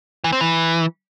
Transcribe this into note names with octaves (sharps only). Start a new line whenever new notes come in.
E3
C4
E3